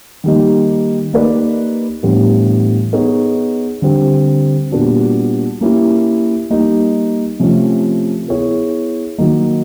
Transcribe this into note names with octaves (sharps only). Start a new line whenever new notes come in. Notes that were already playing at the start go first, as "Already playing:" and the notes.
D#3 G3 A#3 D#4
A#3 D#4 G4 B4 D5
A2 E3 G3 B3 D4
B3 D#4 G#4 C#5
D3 G3 C4
A#2 G3 B3 D4 F#4
A#3 C#4 E4 G4
G3 A#3 D#4
C3 F3 A3 C#4
B3 E4 G#4 C#5
D#3 F#3 A#3 D#4